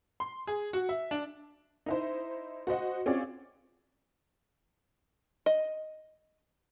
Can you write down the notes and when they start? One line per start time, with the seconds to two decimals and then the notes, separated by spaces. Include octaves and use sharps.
0.20 C6
0.47 G#4
0.73 F#4
0.89 E5
1.11 D4
1.86 D#4 E4 C5
2.67 F#4 C5 D#5 F#5
3.06 C4 C#4 F4 F#4 G#4 D5
5.46 D#5